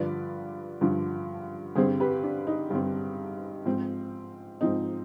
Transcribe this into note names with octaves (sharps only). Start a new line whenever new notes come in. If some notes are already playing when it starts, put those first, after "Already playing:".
Already playing: G2 D3 F3 B4 D5
G2 D3 F3
G2 D3 G3 C4 G#4 C5
G4 B4
D4
D#4
G2 D3 G3 C4
G#2 F3 C4
G#2 F3 C4 D#4